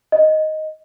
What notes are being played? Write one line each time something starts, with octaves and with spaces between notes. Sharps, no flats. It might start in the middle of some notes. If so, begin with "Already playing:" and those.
D#5